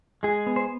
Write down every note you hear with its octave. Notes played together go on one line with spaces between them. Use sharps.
G#3 G#4
B3
C5